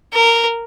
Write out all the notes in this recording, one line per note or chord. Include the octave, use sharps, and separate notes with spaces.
A#4